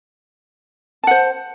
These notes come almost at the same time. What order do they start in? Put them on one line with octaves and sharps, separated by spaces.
A5 F#5 C5